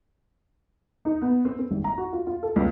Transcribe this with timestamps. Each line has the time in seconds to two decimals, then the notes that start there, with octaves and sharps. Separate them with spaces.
1.05 D#4
1.22 B3
1.45 C4
1.59 C4
1.71 G#1
1.84 A#5
1.98 F#4
2.13 F4
2.27 F4
2.43 A4
2.56 C#2